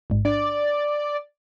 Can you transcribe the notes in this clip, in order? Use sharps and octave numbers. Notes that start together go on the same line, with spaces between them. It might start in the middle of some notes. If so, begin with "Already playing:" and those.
A1 G#2
D4 D5